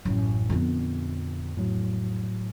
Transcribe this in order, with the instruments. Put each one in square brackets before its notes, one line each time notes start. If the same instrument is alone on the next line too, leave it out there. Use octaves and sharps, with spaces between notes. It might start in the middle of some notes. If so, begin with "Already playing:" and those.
[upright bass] A1 F#2
[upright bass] F2 B3 [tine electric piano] A#2 D3
[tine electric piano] A2 F#3